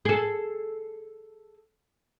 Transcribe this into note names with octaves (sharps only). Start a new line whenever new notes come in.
G#4 A4